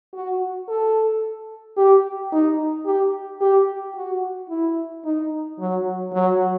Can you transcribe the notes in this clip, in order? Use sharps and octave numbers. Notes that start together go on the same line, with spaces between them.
F#4
A4
G4
D#4
G4
G4
F#4
E4
D#4
F#3
F#3